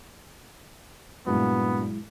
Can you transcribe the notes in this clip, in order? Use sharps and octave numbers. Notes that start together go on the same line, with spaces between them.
G2 A#2 F#3 G#3 B3 E4 F#4